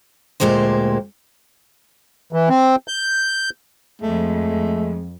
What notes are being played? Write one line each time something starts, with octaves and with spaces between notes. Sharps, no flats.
D2 G2 A#2 G#3 G4 C5
E3
C4
G6
F2 G#3 A3